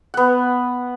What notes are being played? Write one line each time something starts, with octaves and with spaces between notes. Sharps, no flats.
B3 F#5